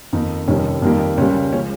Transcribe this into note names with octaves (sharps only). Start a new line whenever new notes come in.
F2 D#3 A#3 D#4
F1 F2 D#3 G3 C#4
F2 D#3 G3 A#3
C#2 C#3 G3 A#3 C#4
F3 G#3 C#4